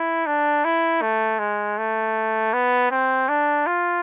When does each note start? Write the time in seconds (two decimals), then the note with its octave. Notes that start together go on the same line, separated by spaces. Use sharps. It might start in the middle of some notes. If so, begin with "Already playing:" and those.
Already playing: E4
0.26 D4
0.65 E4
1.02 A3
1.39 G#3
1.78 A3
2.53 B3
2.91 C4
3.29 D4
3.67 F4